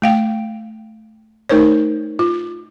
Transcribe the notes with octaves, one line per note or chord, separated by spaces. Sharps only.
A3 F5 G5
A3 D#4 A#4 C5 C#5
F4